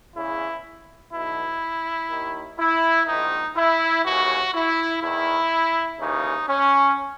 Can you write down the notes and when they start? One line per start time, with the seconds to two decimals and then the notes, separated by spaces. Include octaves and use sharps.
0.16 E2 C#3 E3 E4
1.13 B1 B2 E4
2.10 D#2 D#3
2.58 E4
3.07 A#1 G#2 D#3 D#4
3.56 E4
4.04 D#2 C#3 E3 F#4
4.54 E4
5.02 E2 D#3 E4
5.99 D#2 C#3 E3 D#4
6.48 C#4